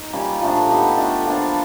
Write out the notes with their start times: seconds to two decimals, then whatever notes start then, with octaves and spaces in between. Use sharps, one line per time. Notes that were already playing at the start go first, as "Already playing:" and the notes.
Already playing: D#4
0.13 G3 A#3 C#4 F4
0.41 A#2 F3 A3 D4
0.69 B3 D#4 G4
0.97 A3 D4 F4 A4
1.26 F3 A#3 D4 F4